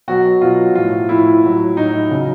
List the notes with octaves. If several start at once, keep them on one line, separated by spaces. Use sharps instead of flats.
B2 F#3 F#4
B2 F#3 F4
A2 F3 F4
A2 F3 E4
A2 F#3
A2 F#3 D#4
C#3 F#3